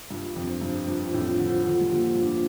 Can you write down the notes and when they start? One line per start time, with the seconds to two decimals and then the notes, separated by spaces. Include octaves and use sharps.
0.10 G2 F4
0.30 D4
0.36 F2
0.49 C5
0.61 G2
0.69 D4
0.88 G2 F4
1.07 D4
1.13 F2 A2
1.26 F4
1.39 D3 F3
1.46 C5
1.64 D3 F3 F4
1.81 G3 A#3
1.90 D3 F3
2.03 F4
2.15 G2
2.23 D4